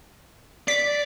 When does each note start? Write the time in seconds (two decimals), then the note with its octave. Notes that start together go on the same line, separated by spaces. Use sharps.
0.68 D5 B6